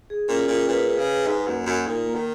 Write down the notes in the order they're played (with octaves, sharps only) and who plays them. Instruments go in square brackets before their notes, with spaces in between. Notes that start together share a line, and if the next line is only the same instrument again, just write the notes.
[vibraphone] G#4
[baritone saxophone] A#2 [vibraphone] C#4
[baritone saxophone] A#2 [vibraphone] G#4
[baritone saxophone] A#2 [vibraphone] B4
[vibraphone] G#4
[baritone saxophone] C#3
[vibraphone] B4
[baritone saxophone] G#2 [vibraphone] D#4
[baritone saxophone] F#2 [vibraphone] A#3
[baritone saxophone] F#2 [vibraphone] A#3
[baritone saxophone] A#2 [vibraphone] D#4
[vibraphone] A#3
[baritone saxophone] D#3